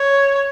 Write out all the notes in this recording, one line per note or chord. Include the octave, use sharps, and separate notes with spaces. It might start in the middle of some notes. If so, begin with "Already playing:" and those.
Already playing: C#5